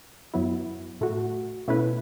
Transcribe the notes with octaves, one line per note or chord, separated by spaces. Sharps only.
F#2 F#3 B3 E4
A2 A3 F#4
B2 A3 C#4 E4 B4